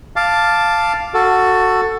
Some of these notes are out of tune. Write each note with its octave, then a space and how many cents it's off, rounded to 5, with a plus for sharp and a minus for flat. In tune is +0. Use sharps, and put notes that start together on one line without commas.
F5 +0 A5 +0 D6 +0
F#4 +0 A4 +15